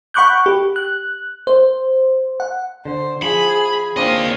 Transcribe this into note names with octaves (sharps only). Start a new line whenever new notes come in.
F#5 B5 C#6 D6 F#6 G6
G4
F#6
C5
F#5
D3 C5
F3 G#4 B5
D#2 A#3 C4 D4 F4 D#5